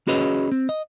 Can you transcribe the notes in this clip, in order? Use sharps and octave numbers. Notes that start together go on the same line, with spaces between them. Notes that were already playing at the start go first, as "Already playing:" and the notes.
C#4 F#4 G#4 B4 C#5 D#5
C4
D#5